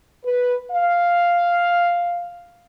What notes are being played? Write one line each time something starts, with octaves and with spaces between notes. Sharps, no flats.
B4
F5